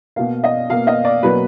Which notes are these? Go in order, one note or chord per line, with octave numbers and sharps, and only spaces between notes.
B2 A#3 F5
D#5
B2 A#3 F5
D#5
D5
B2 F#3 A#3 B4